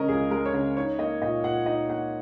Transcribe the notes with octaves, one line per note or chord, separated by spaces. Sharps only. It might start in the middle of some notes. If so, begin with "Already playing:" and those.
Already playing: C#3 G#3 C#4 A#4 D#5
C#2 G#4
G#3 A#4
C#5
C#3 A#4
D#4 C#5
A#3 D#5
A#2 D#5
A#2 F#5
D#4 D#5
A#3 F#5